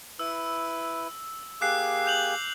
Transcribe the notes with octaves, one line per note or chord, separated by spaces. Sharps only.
E4 B4 E6
A#3 G4 G#4 D6 F#6 C7
G6 F7 F#7